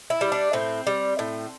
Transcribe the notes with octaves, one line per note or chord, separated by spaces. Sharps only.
E4
G3
D4
A2 C4
G3
A2